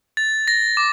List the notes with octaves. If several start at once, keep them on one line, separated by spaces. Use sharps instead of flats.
A6
A#6
D6